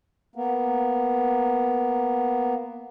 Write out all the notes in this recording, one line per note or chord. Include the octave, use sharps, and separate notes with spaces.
A#3 B3